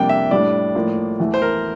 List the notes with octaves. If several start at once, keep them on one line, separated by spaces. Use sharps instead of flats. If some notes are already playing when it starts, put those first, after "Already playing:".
Already playing: F2 C3 G3 A#3 D4 G5
E5
A2 G3 D4 D5
A2 F3 A#3
E2 E3 A3
C5
A#4